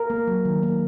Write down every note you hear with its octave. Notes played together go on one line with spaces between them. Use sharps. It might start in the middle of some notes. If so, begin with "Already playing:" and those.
Already playing: A#4
A#3
F#3
D#3
A#3